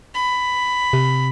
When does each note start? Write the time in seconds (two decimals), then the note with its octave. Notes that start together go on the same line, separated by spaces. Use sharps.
0.15 B5
0.93 C3